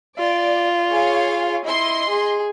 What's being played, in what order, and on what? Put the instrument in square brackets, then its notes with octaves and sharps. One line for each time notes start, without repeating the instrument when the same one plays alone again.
[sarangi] F4 [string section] D5
[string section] G#4 C#5 F5
[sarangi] E4 [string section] D#5 C6
[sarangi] G#4